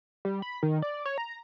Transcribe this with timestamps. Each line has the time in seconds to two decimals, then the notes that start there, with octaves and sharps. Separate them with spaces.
0.25 G3
0.42 B5
0.63 D#3
0.82 D5
1.05 C#5
1.18 A#5